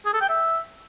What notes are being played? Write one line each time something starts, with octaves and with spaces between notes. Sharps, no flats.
G#4
A4
G5
E5